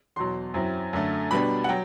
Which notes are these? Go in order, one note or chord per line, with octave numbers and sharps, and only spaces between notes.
E2 B2 F#3 C6
F#2 F#3 C4 E4
F#2 D3 A3
B2 G3 B3 D4 B5
F#5
F#3 G5